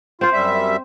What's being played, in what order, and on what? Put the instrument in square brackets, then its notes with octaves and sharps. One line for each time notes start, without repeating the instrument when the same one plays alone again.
[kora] C4 C5 [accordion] F4
[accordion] F#2 G3 E5